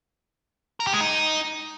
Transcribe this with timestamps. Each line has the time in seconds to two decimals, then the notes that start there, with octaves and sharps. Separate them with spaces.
0.80 A#4
0.87 G4
0.94 G#3
1.01 D#4